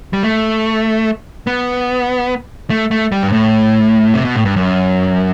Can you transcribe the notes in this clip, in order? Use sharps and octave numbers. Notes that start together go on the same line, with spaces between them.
G3
A3
B3
A3
A3
G3
G2
A2
C3
B2
A2
G2
F#2